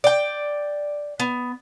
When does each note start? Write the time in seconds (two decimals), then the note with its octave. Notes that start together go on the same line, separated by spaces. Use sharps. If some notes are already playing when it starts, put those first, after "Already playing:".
0.04 D5 G5
1.20 B3